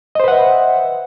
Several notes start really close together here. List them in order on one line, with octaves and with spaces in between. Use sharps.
D#5 C5 B4 F#5 E5